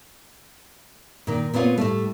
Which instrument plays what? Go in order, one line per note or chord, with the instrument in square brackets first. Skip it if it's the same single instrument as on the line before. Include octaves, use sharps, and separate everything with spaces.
[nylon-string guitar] A#2 D#3
A#2 B3 C4 F4 C#5
A2 G3 A3